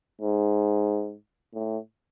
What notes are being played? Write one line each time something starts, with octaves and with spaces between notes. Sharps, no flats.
G#2
A2